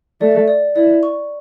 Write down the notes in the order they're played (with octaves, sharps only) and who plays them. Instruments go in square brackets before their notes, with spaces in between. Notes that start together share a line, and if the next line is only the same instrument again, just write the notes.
[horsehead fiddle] A3 [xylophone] D5
[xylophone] D5
[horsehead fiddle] E4 [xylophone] D5
[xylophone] C#6